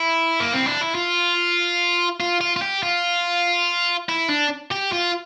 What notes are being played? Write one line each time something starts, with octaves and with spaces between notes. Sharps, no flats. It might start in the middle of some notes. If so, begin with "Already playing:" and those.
Already playing: E4
A#3
C4
D4
E4
F4
F4
F4
F4
G4
F4
E4
D4
G4
F4